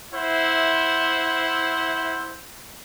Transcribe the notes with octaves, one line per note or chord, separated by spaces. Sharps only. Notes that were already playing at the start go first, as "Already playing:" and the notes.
E4 C5 E5 F#5